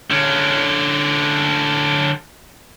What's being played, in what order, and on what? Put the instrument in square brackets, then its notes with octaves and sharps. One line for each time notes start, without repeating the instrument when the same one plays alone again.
[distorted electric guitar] D3 C#4